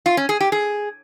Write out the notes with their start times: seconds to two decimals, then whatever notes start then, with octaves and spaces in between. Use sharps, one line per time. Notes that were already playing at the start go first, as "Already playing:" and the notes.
0.06 F4
0.17 C#4
0.29 G#4
0.40 G4
0.52 G#4